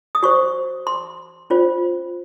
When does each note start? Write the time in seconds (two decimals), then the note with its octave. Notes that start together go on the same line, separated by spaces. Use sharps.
0.15 D#6
0.23 F#4 C5 C#6
0.87 C6
1.50 C#4 F4 C5